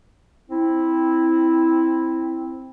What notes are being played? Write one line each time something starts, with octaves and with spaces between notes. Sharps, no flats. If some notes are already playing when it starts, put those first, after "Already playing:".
C4 E4